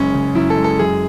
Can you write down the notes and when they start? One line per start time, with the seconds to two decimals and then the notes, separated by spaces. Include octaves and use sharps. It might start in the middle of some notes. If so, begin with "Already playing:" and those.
Already playing: F#1 G#3 C#4
0.15 C#3
0.35 F#2 E4
0.50 A4
0.57 G#3
0.64 A4
0.79 F#2 G#4